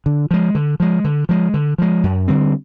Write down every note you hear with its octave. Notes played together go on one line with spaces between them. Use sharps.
D3
F3 G#3
D3
F3 G#3
D3
F3 G#3
D3
F3 G#3
F#2
D3 G3 C4